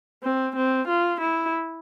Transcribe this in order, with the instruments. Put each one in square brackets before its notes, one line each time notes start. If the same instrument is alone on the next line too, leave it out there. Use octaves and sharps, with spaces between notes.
[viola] C4
C4
F4
E4